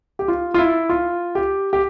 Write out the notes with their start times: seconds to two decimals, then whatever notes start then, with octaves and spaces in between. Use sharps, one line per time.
0.19 G4
0.28 F4
0.54 F4
0.58 E4
0.89 F4
1.35 G4
1.73 G4